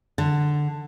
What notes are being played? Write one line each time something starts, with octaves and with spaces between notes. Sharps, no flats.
D3